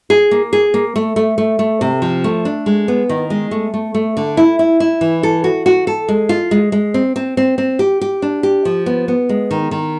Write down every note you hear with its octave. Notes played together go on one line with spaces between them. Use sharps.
G#4
A#3
G#4
A#3
A3
A3
A3
A3
C3
F3
A3
D4
G#3
B3
D#3
G#3
A3
A3
A3
D3
E4
E4
E4
E3
A4
F#4
F#4
A4
G#3
F4
G#3
G#3
C4
C4
C4
C4
G4
G4
D4
G4
F3
B3
B3
G#3
D#3
D#3